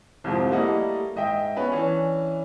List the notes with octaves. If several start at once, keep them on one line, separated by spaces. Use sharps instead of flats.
C2 F2 G#2 F3
G3 A3 A#3 E4 D#5 F#5
G#2 D#5 E5 G5
B3 C#4 B4 G#5
E3 C#4 D4